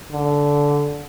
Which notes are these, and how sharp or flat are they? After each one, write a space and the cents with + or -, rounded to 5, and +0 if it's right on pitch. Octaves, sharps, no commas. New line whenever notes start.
D3 -15